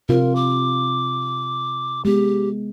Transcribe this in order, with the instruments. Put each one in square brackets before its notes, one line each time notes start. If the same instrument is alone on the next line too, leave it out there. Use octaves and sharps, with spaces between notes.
[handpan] C3 F4 [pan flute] A#4
[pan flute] D6
[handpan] G#3 B3 [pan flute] G4